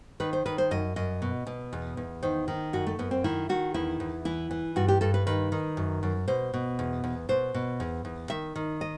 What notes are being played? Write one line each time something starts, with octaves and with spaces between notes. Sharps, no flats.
D#3 B4
C5
D#3 B4
C5
F#2 D#5
F#2 D#5
B2
B2
E2
E2
D#3 C5
D#3
F#2 F#4
A3
F#2 B3
C4
D#3 E4
D#3 F#4
E2 E4
E2
E3 E4
E3
G2 F#4
G4
G2 A4
B4
D#3 B4
D#3
F#2
F#2
B2 C5
B2
E2
E2
B2 C5
B2
E2
E2
D#3 E5
D#3
D#5